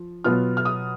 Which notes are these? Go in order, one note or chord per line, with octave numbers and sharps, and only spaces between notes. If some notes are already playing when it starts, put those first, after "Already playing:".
Already playing: F3
B2 F#3 B3 F4 F6
F6
D#6